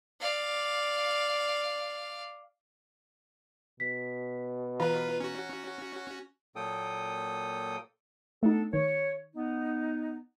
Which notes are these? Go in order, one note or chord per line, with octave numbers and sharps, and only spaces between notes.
D5 F5
B2 B6
E3 F4 B4 F5 A#5
C#4 F#4
A#2 F#3 A#3 A4 G5 D#6
A3 B3 D4 D#4 A4
D#3 C#5
B3 D#4